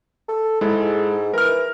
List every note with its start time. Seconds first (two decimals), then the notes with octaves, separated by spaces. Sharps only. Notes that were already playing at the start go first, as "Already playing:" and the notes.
0.28 A4
0.61 G#2 G#3 E4 A4
1.34 E3 A#4 F6